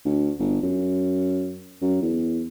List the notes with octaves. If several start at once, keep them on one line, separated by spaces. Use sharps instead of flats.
D2
G1
F#2
F#2
E2